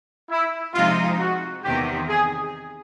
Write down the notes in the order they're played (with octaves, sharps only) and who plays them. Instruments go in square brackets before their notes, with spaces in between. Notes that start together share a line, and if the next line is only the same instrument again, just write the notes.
[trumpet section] E4
[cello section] C3 F3 G#3 C4 D#4 [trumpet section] F4
[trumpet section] F#4
[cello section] E2 C3 D#3 [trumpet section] G4
[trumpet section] G#4